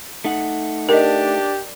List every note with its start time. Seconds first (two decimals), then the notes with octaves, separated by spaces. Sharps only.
0.25 A3 D#4 F#5
0.89 D4 G4 A#4 D#5